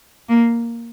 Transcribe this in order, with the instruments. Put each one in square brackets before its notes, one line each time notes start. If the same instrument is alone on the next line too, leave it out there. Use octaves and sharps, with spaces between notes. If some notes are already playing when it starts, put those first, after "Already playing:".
[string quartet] A#3